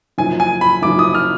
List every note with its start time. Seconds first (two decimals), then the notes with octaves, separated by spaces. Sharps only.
0.18 F#1 F#2 F3 G#5
0.40 G#5
0.61 B5
0.82 F#1 F#2 F3 D6
0.99 D#6
1.15 F6